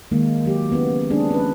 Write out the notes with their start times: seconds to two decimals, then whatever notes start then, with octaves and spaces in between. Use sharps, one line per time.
0.11 D#3 G#3 A#3
0.45 F#3 G4
0.71 C#3 E3 B3
1.10 G#3 B3 C4 D4 G#4
1.30 C#4 B4